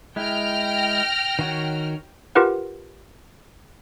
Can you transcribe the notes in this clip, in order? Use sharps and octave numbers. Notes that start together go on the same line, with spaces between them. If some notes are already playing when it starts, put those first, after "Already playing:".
G#3 E4 G5 F6 A#6
D#3 F#4 C#5
F4 G4 A#4 B4 F#5